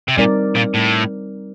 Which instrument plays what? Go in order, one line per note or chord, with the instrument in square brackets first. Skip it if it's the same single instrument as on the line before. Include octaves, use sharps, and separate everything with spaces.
[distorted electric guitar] C3
[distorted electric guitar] A#2 [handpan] G3 C4 D#4 A#4 D5
[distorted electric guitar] A#2
A2